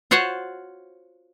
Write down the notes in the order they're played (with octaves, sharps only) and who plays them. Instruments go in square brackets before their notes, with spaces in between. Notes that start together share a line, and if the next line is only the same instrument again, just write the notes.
[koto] F4 F#4 C5 C#5 F#5